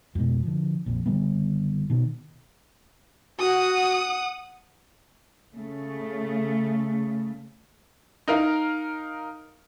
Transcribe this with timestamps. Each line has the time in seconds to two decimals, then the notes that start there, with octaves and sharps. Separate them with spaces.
0.15 F2 G#2 B2
0.43 D3 F3
0.86 A#1 F2
1.06 F#1 D3 G3 B3
1.90 B2 D#3
3.39 F#4 F#5 D#6
5.55 C#3 A3
8.28 D#4 A#4 F5